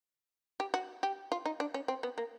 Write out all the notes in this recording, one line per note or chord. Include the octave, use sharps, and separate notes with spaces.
G4
F#4
G4
F4
D#4
D4
C#4
C4
B3
A#3